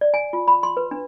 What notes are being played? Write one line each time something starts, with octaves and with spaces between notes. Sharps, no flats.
D5
G#5
F4
B5
C6
B4
D4